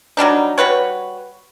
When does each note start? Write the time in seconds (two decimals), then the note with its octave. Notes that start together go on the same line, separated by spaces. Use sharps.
0.17 F#3 G3 D4 D#4
0.58 G3 F#4 B4 C#5